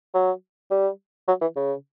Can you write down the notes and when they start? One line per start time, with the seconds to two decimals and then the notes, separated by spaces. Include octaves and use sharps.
0.14 F#3
0.71 G3
1.28 F#3
1.41 E3
1.56 C#3